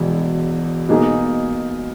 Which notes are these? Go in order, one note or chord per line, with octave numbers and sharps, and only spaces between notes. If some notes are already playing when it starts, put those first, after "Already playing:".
Already playing: E1 E2 B2
B2 A#3 D#4 G#4